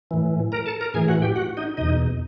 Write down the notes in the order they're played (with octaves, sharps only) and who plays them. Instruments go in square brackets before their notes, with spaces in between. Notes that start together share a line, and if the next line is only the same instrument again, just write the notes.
[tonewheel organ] A2 E3
A#4 A#5
A4 A5
A#4 A#5
A2 E3 G#4 G#5
F#4 F#5
G4 G5
F#4 F#5
D#4 D#5
E2 B2 D#4 D#5